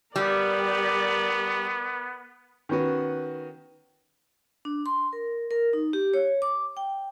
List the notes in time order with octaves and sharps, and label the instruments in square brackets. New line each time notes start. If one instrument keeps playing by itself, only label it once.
[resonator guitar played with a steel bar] G3 [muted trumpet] B3 [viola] A#4 D5
[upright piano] D#3 B3 C#4 F#4 B4
[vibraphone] D4
C6
A#4
A#4
D#4
G4
C#5
D6
G5